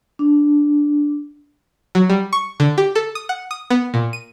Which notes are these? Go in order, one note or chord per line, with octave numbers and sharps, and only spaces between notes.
D4
F#3
G3
C#6
D3
G4
A4
D#6
F#5
D#6
B3
A#2
D#7